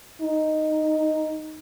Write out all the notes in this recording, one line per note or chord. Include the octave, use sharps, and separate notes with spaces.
D#4